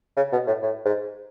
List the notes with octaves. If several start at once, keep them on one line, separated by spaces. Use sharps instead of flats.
C#3
B2
A2
A2
G#2